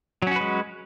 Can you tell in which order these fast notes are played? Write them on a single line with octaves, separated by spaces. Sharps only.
F#3 C#4 F#4 B4 G#3